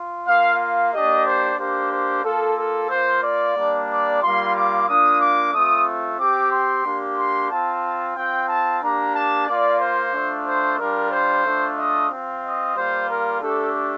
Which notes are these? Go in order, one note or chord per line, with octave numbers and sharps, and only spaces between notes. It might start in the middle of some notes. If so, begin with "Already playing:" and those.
Already playing: F4
A#3 F4 F5
F5
A#3 D4 G4 D#5
C5
A#3 D4 G4 C5
C5
A#3 F4 A4
A4
A#3 F4 C5
D5
G3 A#3 D4
D5
G3 A#3 F4 C6
D6
A#3 D4 F4 D#6
D6
A3 C4 F4 D#6
C4 G4 D6
C6
A#3 D4 G4
C6
C4 F4 A5
C4 F4 G5
A5
A#3 D4 G4 A#5
A5
A#3 F4 D5
C5
A3 D4 F4
C5
G3 D4 F4 A#4
C5
A3 D4 F4
D#5
C4 F4
D#5
G3 A#3 F4 C5
A#4
A3 D4 G4 A4